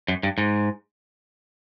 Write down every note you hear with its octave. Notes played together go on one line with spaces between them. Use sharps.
F#2
G2
G#2